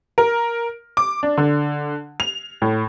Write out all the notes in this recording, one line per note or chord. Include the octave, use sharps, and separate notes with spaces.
A#4
D6
D4
D3
F7
A2